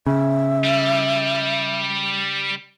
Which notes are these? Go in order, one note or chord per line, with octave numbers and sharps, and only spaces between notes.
C#3 E5
G3